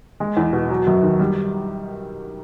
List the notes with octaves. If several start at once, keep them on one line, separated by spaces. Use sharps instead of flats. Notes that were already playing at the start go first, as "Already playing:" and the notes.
G#3
E2
B2
F#3
F#2
D#3
G3